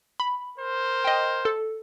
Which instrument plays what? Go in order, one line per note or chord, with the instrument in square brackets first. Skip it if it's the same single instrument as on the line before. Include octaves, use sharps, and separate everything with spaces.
[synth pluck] B5
[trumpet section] A#4 C5
[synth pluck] D#5 G5
A4